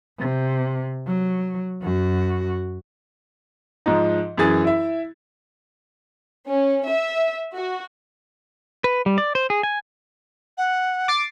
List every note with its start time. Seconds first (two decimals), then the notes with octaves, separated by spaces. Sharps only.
0.19 C3
1.07 F#3
1.83 F#2 F#4
3.86 G#2 F3 D#4
4.38 F#2 E3 G#4 A6
4.64 E4 E5
6.49 C#4
6.88 E5
7.54 F#4
8.84 B4
9.06 G3
9.18 D5
9.35 C5
9.50 G#4
9.63 G#5
10.58 F#5
11.08 D6 A6 C7